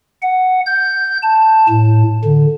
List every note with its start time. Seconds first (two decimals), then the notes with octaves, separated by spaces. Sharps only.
0.22 F#5
0.66 G6
1.23 A5
1.69 A2
2.25 D3